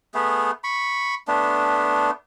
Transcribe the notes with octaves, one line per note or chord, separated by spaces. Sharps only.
A3 B3 G#4
B5 C#6
A3 B3 D4